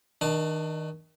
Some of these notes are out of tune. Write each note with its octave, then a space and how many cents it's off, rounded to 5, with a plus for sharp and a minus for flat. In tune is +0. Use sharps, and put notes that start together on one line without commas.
D#3 +20 D4 +45 A5 +0